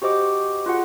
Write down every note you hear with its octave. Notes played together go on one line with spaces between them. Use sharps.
F#4 G4 C5 D#5 D6
F4 F#4 G#4 F#5